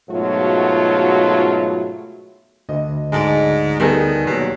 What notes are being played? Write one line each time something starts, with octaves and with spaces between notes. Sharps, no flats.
G#2 B2 F#3 A3 F4 F#4
D2 D#5
G#2 G#3 A4 D5
D#3 G3 B3 G#4 A4
D#2 B2 F#3